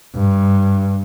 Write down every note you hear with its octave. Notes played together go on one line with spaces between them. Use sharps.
G2